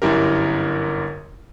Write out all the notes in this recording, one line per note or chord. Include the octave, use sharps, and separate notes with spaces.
G1 F#2 E4 G4 A#4